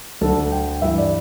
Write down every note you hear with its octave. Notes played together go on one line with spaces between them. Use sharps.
D2 D3 A4
G5
G2 E3 E5
D5